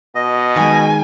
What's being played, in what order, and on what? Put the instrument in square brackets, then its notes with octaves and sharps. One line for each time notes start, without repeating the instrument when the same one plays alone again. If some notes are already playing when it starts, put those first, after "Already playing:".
[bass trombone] B2 [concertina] D#5
[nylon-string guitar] D#3 G#3 [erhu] G#5